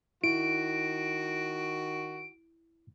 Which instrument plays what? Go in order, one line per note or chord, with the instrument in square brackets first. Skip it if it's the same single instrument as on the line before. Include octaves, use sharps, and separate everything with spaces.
[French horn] D#3 [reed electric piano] E4 [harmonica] F#4 [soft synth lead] D7